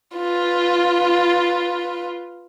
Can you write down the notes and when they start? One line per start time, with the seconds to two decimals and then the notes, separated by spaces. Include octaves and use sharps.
0.17 F4 B4